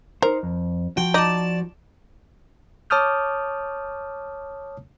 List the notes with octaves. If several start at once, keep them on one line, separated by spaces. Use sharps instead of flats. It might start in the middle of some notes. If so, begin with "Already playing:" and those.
D#4 A#4 C5
F2
F3 F#4 G5
D#4 D5 A5
C#5 A5 D6 D#6 F6 G6